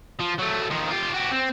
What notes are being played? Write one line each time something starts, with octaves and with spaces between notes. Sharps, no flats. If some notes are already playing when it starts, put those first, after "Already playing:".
F3
F#3 A3
D#3 F3
F4 G4
F#4 G4
C4